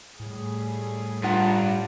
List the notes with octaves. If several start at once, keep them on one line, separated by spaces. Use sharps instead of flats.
A2 G3 A3 G#4
G2 F4 F#5 A#5